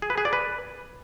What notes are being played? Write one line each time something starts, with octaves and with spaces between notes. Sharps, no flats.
G#4
B4
G#4
D5
B4